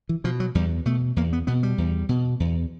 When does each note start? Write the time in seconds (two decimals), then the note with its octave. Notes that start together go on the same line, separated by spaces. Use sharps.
0.09 E3
0.24 B2 F3
0.40 F#3
0.55 E2 G3
0.86 B2 A3
1.16 E2 A#3
1.33 B3
1.47 B2 B3
1.63 G3
1.78 E2
2.09 B2
2.40 E2